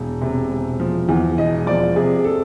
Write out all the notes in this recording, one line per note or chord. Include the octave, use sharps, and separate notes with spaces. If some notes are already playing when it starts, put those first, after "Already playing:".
Already playing: E1
C3
E1
F3
E2
E1 D#5
F3 D5
C3 G#4
A4